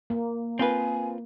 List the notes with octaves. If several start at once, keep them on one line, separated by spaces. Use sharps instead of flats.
A#3
C4 F4 B4 G#5